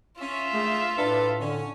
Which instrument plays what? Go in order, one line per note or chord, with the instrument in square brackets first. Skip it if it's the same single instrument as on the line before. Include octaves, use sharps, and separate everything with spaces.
[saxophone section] C#4 [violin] F4 E5
[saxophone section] D#3 G#3 D4 [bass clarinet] A3
[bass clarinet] A2 [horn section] D4 B4 [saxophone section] A4
[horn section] D3 [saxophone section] C#4